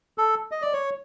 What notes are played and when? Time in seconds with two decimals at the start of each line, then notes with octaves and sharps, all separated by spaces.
0.18 A4
0.51 D#5
0.62 D5
0.73 C#5